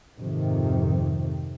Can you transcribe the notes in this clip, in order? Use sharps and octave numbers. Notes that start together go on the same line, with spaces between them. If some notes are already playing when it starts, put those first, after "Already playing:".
F2 G#2 C3 D#3